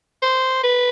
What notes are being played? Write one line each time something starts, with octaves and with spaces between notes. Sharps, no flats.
C5
B4